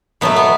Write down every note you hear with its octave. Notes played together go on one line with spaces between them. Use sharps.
B2 F#3 A3 B3
B3